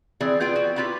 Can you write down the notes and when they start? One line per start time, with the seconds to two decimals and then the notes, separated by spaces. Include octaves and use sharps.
0.20 E3 C4 G#4 D5
0.40 B3 F4 G#4 G5 G#5
0.56 F#4
0.76 B3 E4 F4 G4 B4